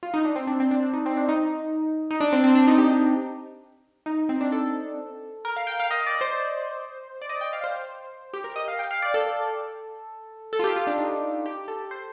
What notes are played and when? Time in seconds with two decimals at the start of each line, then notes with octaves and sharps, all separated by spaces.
0.03 F4
0.14 D#4
0.25 D4
0.36 C4
0.47 D4
0.60 C4
0.71 D4
0.82 D4
0.93 D#4
1.06 C4
1.17 D4
1.29 D#4
2.11 D#4
2.20 D4
2.33 C4
2.44 C4
2.55 D4
2.67 D#4
2.78 G4
4.06 D#4
4.29 C4
4.41 D4
4.52 A4
5.45 A#4
5.56 F5
5.67 G5
5.80 F5
5.91 D#5
6.07 D5
6.21 C5
7.21 D5
7.29 D#5
7.41 G5
7.53 F5
7.64 C5
8.33 G4
8.44 A#4
8.56 D#5
8.68 F5
8.79 G5
8.91 F5
9.02 D5
9.14 A4
10.53 A4
10.59 F4
10.64 G4
10.76 F4
10.87 D4
10.99 D#4
11.46 G4
11.68 A4
11.91 C5